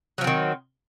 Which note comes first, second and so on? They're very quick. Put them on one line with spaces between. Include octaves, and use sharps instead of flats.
F#3 F3 C4 D#3